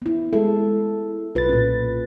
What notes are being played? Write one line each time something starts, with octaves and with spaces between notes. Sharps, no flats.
B3 E4
G#3 E4 A4
B1 F4 B4 A6
A#2 C#4